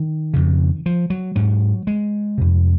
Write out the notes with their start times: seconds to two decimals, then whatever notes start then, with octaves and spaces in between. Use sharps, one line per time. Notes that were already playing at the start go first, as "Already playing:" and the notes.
Already playing: D#3
0.34 F2 C#3
0.86 F3
1.10 F#3
1.36 G#2 F#3
1.87 G#3
2.38 F2 C3